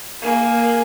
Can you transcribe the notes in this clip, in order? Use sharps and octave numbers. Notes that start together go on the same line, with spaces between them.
A#3 G#4